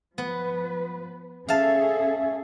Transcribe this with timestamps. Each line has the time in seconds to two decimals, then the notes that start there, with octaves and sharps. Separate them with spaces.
0.18 F3 B3 B4
1.49 C#4 G#4 A4 E5 F5 A5